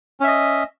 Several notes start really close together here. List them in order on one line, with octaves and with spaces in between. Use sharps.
C#4 E5 D#5